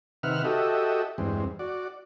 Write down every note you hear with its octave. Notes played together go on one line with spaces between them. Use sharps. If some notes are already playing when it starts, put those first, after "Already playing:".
C3 D#3 B4 E5 F#5 F6
F#4 G4 A4 D#5 E5
E2 G2 G#3 C4
F#4 D5